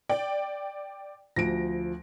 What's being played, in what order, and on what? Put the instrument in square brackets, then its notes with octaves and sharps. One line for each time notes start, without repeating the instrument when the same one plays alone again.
[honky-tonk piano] D5 G5
[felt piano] D2 F3 D7 [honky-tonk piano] A#6